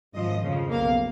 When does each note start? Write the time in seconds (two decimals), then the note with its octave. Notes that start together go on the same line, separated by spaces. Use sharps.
0.14 G#1 F#2 F3 D#5
0.43 F2 C#3 F3
0.71 B1 B2 A#3 F5